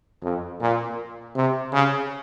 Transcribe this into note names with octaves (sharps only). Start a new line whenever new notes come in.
F2
A#2
C3
C#3